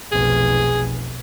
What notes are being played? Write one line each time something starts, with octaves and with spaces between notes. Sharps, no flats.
F1 B1 G#4